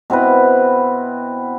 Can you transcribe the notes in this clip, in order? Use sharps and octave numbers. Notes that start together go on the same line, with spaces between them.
B2 C4 E4 B4